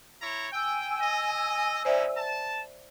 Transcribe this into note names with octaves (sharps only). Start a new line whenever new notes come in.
E4 C#5 A#5
G5 G#5 E6
D#5
C#4 D#4 E4 C5 D5 E5
A5